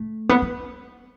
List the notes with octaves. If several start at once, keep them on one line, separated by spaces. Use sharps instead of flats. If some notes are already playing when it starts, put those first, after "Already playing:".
Already playing: A3
B3
B3